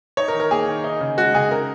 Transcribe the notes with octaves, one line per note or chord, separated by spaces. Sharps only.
D#4 C#5
A#4
D#3
A#4
A#3 G#4
D#3
D#4
C#3
G#3 F#4
C#3 G#4
D#4 A#4